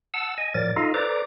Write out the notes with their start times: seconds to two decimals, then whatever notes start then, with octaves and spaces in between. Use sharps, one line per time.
0.14 F#5 A5 E6
0.38 D#5 G#5
0.54 A2 F3 F#3 A#4 D5 A6
0.76 D#4 F4 A4 D#5 F5
0.94 A4 B4 C5 D5 A#5 D6